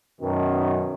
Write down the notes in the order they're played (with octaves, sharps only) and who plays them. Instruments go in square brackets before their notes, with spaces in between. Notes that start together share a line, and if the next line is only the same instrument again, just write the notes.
[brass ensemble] F#2 B2 D#3